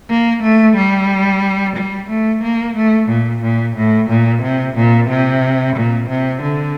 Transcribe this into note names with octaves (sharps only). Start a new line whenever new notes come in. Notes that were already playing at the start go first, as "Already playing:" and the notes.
A#3
A3
G3
G3
A3
A#3
A3
A#2
A#2
A2
A#2
C3
A#2
C3
A#2
C3
D3